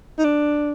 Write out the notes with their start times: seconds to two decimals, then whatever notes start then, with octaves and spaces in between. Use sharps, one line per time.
0.19 D#4
0.24 D4